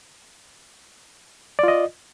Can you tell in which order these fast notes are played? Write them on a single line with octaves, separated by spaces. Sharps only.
D5 F4 D#5